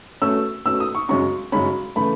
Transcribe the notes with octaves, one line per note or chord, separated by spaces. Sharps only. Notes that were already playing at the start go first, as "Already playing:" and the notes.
B2 A3 C#4 E6
B2 A3 C#4 E6
D#6
C#6
F#2 C#3 G#3 C#4 C#6
F#2 C#3 G#3 C#4 B5
C#3 E3 A3 B5